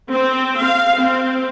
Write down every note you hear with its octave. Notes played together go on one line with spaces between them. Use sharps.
C4
F5
C4